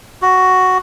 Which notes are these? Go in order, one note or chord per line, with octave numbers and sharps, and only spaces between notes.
F#4